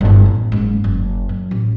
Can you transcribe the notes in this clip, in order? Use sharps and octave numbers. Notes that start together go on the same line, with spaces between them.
G1 E4
A1
F#1 G#2
F#1
F#2
A1